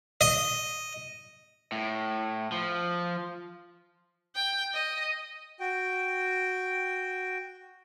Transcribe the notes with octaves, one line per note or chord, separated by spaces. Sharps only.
D#5
A2
F3
G5
D#5
F#4 G5